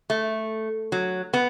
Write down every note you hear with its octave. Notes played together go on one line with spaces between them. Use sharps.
A3
F#3
B3